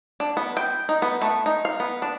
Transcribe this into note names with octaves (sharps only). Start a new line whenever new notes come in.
D4
B3
G5
D#4
B3
A3
D#4
F5
B3
D4